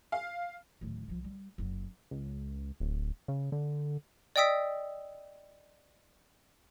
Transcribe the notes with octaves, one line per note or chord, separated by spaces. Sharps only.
F5
D1 D#3
C2 F3
G3
F#1 F#3
C#2
D1
C#3
D3
D5 D#5 G5 D#6 E6 B6